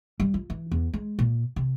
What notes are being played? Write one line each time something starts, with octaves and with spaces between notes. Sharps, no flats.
G3
F4
E3
E2
G#3
A#2
C3